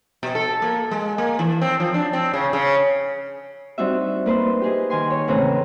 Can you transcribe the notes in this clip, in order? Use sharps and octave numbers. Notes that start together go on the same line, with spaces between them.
B2
A4
A#3
G#3
A#3
E3
C4
F3
D4
C4
C#3
C#3
G3 C4 D4 D#4 F#4 E5
A#3 B4 C5
G4 G#4 D#5
D#3 G#5 C6
C#5
E2 A2 C#3 C4 B4 A#5